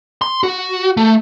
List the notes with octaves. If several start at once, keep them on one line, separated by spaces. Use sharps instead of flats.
C6
F#4
A3